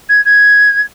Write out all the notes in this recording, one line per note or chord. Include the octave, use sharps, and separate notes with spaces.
G#6
G#6